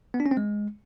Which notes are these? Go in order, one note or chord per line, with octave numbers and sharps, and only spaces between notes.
B3
D4
C#4
C4
G#3